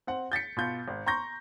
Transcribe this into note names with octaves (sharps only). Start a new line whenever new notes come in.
C4 F#5
G6 A6 B6 C#7
B2 F4 G6
G#1
A#5 C6 C#6 G6 A#6